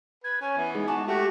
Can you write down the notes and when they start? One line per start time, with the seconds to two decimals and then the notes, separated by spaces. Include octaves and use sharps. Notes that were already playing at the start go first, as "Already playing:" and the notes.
0.24 B4 G#6
0.41 C#4 G#5
0.57 E3 B3
0.74 G#3 D#4 G#4
0.88 F#4 G#5 A5 D6
1.08 A3 F#4 G4 F#5